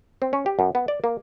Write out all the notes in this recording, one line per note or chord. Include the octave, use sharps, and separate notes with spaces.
C4
C#4
G4
F#2
B3
D5
A#3